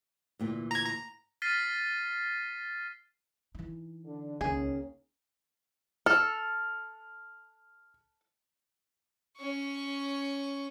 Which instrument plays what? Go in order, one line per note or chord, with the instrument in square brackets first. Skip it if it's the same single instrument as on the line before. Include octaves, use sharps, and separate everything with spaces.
[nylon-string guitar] D2 A#2 E3
[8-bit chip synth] A#5 G#6
A#5
[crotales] F6 A6 B6 C7 D#7
[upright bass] E3 D#4
[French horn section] D3 D4
[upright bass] C#2 [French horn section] D#3 A#3 C#4 [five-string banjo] G#4
[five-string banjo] A4 [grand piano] F6
[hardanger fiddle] C#4 C#6